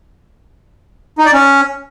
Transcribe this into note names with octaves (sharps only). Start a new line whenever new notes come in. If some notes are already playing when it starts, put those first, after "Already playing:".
D#4
D5
C#4